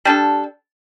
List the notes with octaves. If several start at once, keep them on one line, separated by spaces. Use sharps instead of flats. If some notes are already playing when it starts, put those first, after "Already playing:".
G3 D4 A4